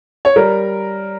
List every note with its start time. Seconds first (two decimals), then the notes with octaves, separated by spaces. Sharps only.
0.25 C#5
0.36 G3 A#4